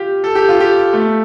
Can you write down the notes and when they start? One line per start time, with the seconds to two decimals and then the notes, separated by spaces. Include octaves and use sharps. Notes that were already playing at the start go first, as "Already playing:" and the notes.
Already playing: F4 G4
0.24 A4
0.35 G4
0.49 F4
0.60 G4
0.93 A3